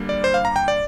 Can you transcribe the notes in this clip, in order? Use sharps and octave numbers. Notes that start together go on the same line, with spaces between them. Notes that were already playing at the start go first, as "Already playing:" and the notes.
Already playing: D3 G3 A#3 D4
D5
C5
F5
A#5
G5
D5